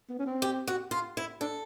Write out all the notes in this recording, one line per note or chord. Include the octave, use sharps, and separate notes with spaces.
B3
C#4
C4
G4
F#4
F4
E4
D4 A4